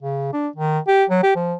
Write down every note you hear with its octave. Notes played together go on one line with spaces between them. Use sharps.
C#3
D4
D#3
G4
F#3
G4
F3